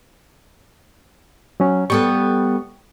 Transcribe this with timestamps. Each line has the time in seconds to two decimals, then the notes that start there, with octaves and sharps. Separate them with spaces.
1.60 F#3 C#4
1.90 G3 B3 A4 C#6